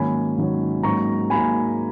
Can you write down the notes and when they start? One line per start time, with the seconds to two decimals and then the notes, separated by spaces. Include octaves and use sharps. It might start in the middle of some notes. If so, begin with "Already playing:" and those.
Already playing: G#2 D#3 F#3 A#3 C#4 G#5 B5
0.37 G#2 D#3 F#3 A#3 C#4
0.83 G#2 F#3 A#3 C#4 A#5 C#6
1.30 G#2 F#3 A#3 C#4 G#5 B5